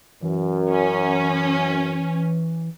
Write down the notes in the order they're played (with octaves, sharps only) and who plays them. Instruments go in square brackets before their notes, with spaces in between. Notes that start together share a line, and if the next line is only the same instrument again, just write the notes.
[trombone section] F#2 [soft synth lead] E3
[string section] C#4